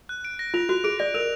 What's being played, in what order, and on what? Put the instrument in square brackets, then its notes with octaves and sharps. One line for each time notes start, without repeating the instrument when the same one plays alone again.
[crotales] F#6
D7
A#6
[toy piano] F4 [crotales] F7
[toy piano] F#4 [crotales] F#6
[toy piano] G#4 [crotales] D7
[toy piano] D5 [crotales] A#6
[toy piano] A#4 [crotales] F7